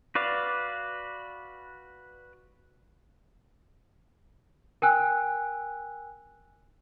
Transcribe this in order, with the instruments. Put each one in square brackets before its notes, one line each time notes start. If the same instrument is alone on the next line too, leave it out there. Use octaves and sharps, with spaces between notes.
[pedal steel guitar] F#4 B4 D5 F5
[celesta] A#4 G5 G#5 E6 F#6